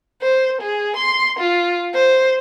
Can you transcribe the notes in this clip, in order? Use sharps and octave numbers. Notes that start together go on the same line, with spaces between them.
C5
G#4
C6
F4
C5